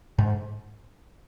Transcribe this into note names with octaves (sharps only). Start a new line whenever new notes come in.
G#2